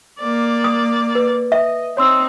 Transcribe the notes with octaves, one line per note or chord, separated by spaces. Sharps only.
A#3 D5
D#6
B4
D#5 E5
C4 D#4 C#5 C6 E6